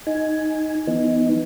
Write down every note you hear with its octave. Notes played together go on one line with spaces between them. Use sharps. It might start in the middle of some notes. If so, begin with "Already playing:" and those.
D#4 G#5
E3 B3 D#4